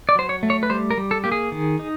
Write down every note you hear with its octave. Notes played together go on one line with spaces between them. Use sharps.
D5
F#3 C5
C#5
A3
C#5
B4
G3 C5
A#4
G3
A4
A#3 G4
G#4
D#3
D#4